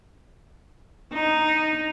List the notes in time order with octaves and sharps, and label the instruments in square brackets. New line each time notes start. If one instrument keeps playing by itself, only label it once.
[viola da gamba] D#4